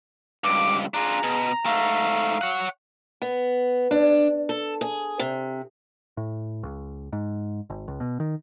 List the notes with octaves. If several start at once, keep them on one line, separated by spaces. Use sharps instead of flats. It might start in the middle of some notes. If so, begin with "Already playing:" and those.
C#2 G2 D6
D4 F4 G#4 A#5
B2
G#2 A3 F5
C#5 F#5
B3
D4
A4
G#4
C3
A2
C#2
G#2
G#1
C#2
B2
D#3